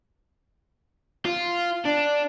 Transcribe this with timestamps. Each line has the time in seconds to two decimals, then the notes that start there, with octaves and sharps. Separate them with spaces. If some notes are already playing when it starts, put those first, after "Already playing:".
1.25 F4
1.85 D4